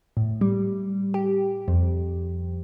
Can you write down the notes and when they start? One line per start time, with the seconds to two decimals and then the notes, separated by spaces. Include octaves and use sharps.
0.17 A2
0.41 G3
1.14 G4
1.68 F2